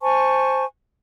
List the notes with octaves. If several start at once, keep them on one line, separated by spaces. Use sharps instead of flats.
C5 G#5 A5 C#6